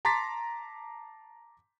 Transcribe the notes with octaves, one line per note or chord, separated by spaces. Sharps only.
A5 A#5 C6 D6 A6 B6